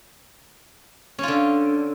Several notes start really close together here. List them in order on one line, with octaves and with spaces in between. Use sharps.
C#4 F4 D3